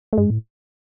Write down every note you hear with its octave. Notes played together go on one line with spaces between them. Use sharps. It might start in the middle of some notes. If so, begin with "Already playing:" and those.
A3
G2 G#3
A2